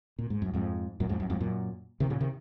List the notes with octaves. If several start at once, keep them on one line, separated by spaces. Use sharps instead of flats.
A#2
G#2
F#2
F2 G#2
F#2 A#2
F2 G#2
F#2
F2 G#2
F#2 A#2
C3 D#3
A#2 C#3
C3 D#3